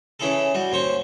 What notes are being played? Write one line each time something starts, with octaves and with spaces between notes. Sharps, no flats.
C#3 E3 C#4 E4 G#4 A4
G3 F#4
D#2 C#4 C5 C#6